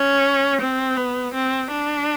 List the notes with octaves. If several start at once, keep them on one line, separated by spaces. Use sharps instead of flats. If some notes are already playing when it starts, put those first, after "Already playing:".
Already playing: C#4
C4
B3
C4
D4